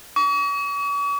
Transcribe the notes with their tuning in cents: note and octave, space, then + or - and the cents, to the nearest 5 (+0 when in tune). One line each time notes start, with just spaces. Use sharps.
C#6 +45